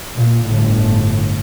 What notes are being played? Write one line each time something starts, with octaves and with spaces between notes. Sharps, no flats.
A#2
G1 A2